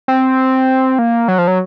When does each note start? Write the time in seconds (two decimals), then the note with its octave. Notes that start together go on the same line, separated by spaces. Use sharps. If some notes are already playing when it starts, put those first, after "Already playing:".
0.08 C4
0.99 A#3
1.28 F#3
1.38 F3
1.48 F#3